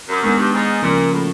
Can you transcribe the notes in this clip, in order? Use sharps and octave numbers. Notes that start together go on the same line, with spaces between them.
F#2
F#2 D#3 G#3 B3 D4
G2
G#2
A#2 C#3 F3 A#3
A2